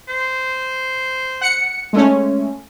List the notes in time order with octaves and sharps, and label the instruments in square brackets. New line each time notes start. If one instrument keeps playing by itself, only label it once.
[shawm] C5
[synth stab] F#5 C#7
G#3 A3 C#4